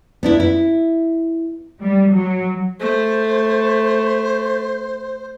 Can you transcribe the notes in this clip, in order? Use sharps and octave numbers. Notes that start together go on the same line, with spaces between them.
B3 D4 E4
E4
G3
F#3
A3 C5